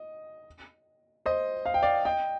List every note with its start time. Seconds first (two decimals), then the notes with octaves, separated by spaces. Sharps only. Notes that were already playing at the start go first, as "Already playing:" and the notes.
Already playing: D#5
1.26 C5 D#5
1.66 F5
1.74 G5
1.83 D5 F5
2.05 D#5 G5